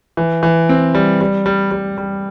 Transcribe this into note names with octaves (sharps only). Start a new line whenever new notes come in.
E3
E3
C4
G3
G3
G3
G3
G3